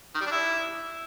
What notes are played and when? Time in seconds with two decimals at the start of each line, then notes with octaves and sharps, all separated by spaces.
0.15 D#3
0.20 G3
0.26 D4
0.32 E4